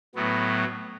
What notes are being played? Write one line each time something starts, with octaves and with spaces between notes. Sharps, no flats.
A2 F#3 B3